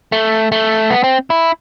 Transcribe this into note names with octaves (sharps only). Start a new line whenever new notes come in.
A3
A3
B3
C4
E4